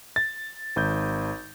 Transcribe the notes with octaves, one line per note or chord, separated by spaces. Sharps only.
A6
G#1 G6